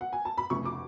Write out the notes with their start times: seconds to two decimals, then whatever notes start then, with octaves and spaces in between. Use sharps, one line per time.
0.01 F#5
0.13 G#5
0.25 A5
0.38 B5
0.50 F1 F2 C#3 F3 A3 C#6
0.65 D6